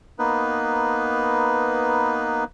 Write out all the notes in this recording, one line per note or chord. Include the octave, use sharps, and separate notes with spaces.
A#3 B3 D#4 B4